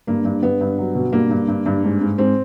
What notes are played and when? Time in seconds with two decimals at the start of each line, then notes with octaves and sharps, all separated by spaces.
0.07 G2 A#3
0.25 G2
0.42 G2 B3
0.61 G2
0.78 F#3
0.95 B2
1.13 G2 A#3
1.30 G2
1.48 G2
1.66 G2
1.84 G#2
2.01 G#2
2.18 G#2 C4